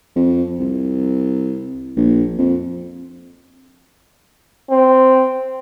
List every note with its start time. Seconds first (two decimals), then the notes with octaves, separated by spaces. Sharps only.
0.16 F2
0.60 C2
1.96 A#1
2.38 F2
4.70 C4